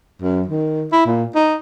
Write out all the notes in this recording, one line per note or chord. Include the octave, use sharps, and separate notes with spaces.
F#2
D#3
E4
A#2
D#4